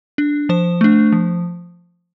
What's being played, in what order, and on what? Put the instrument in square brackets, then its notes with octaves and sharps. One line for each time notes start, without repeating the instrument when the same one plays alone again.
[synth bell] D4
F3 C5
A3 D4
F3